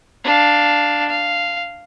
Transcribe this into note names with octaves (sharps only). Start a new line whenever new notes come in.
D4 F5
F5